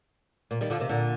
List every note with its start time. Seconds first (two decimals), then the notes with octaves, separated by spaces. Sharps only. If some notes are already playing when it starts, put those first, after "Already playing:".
0.51 A#2
0.61 D#3 G3
0.70 D3 F3
0.80 C3 D#3
0.89 A#2 D3